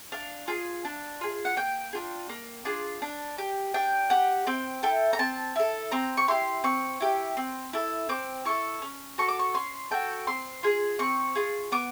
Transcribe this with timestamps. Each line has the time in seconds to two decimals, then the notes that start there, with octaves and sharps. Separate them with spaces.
0.12 D4 F5
0.48 F4 G#4
0.85 D4
1.21 F4 G#4
1.45 F#5
1.57 A#3 G5
1.93 D4 F4 G#4
2.29 A#3
2.65 D4 F4 G#4
3.02 D4
3.38 G4
3.74 D4 G5
4.10 G4 F#5
4.47 C4 G5
4.83 E4 A4 G5
5.13 A#5
5.19 C4 A5
5.56 E4 A4
5.92 C4 A#5
6.17 C#6
6.28 E4 G4 C6
6.64 C4 C#6
7.01 E4 G4
7.37 C4
7.73 E4 A4
8.09 C4 D6
8.45 E4 A4 C#6
8.82 C#4
9.18 F#4 A4 C#6
9.28 D6
9.39 C#6
9.54 C#4 C6
9.91 F#4 A4 G5
10.27 C4 C6
10.63 F4 G#4
10.99 C4 C#6
11.35 F4 G#4
11.72 B3 D6